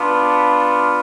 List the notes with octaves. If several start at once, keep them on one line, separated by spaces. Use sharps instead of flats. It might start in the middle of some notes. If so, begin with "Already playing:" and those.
Already playing: B3 D4 F4